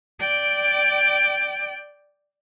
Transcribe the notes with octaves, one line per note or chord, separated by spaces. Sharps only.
D5 G5